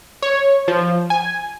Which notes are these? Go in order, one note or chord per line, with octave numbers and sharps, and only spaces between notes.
C#5
F3
G#5